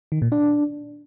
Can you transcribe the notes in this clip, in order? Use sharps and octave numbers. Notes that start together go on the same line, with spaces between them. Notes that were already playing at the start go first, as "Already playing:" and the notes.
D#3
A#2
D4